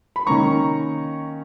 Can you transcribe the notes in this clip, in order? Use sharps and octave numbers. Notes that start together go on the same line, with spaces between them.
B5
D#3 A#3 C#4 A#5 C#6